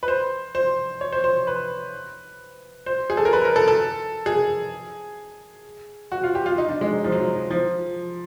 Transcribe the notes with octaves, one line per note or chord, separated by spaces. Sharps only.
B4
C5
C5
C#5
C5
C5
B4
C5
G#4
A4
A#4
B4
A#4
A4
A4
G#4
F#4
F4
G4
F4
D#4
D4
G#3
F#3
F3
F#3
F3
F3